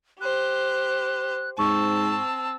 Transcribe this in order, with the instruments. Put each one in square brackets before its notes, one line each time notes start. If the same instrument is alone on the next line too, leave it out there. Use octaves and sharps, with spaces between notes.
[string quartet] G4 C5 [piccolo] F#6
[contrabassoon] G#2 [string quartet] C4 A5 [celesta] C#6 [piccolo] E6